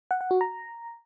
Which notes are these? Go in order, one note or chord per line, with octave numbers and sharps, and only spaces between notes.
F#5
F#5
F#4
A#5